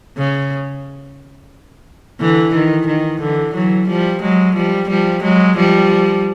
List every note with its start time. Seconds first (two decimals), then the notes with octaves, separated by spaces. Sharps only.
0.18 C#3
2.20 D3 E3
2.54 D#3
2.87 D#3
3.21 D3 E3
3.54 E3 F#3
3.88 F3 G3
4.22 F#3 G#3
4.55 F3 G3
4.89 F3 G3
5.23 F#3 G#3
5.56 F3 G3